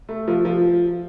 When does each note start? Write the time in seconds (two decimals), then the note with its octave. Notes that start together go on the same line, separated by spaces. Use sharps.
0.09 A3
0.28 F3
0.45 F3